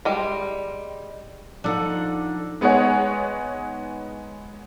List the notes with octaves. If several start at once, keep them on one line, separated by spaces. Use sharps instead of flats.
G3 G#3
F3 D4 D#4 A4 F#5
G#3 B3 D#4 G#4 C#5 F#5